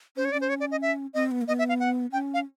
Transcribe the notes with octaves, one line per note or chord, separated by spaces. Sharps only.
C#4 C5
C#5
C#4 D5
C5
C#5
D5
D#5
E5
C4 D#5
B3
A#3
B3 D#5
E5
F5
F#5
C#4 G5
F5